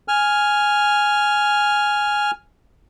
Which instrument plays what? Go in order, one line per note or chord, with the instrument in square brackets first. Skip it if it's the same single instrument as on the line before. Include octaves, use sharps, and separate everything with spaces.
[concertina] G#5 F6